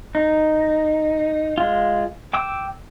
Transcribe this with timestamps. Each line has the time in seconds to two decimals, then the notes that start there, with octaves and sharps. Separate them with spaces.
0.15 D#4
1.58 G#3 F4
2.33 G5 D6 E6